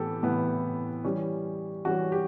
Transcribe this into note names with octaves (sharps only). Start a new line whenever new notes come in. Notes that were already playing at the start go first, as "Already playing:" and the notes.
Already playing: A2 E3 B3 G4 A4
A2 E3 B3 E4
E3 G3 C#4
E3 G3 C#4 F#4
G4